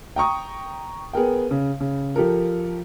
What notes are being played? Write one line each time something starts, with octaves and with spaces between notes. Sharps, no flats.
G5 A#5 C#6 D#6
B3 G#4 A#4 G5
C#3
C#3
F3 G4 A4 A#4